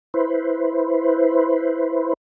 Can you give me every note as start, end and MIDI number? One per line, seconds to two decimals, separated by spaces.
0.14 2.13 64
0.14 2.13 71
0.14 2.13 72